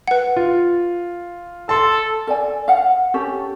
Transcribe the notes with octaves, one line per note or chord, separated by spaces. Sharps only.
B4 F#5
F4
A4 A5 C6
A4 D5 G#5
F5 F#5
C#4 G4 A4